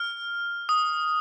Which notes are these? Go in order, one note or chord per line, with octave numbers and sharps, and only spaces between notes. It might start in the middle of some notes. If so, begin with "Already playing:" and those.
Already playing: F6
D#6